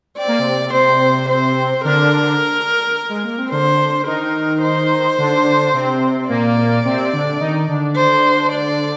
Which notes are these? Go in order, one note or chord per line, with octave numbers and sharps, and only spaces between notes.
C4 D5
A#3
C3 C4
C3 C4 C5
C5
D3 D4 A#4
G#3
A#3
C4
D3 D4 C5
D#3 D#4 A#4
C5
D3 D4
C3 C4
A#2 A#3 D5
C3 C4
D3 D4
D#3 D#4
D3 D4
C5
D5